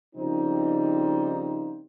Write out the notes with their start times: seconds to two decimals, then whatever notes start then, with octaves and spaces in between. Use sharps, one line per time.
0.15 C#3 F3 G3 A#3 C4 D#4